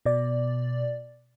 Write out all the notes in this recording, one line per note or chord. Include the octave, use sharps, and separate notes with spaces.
B2 D5